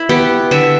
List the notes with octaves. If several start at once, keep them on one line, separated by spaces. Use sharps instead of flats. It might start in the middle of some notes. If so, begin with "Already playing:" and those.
Already playing: E4
B3 G4
D3 E5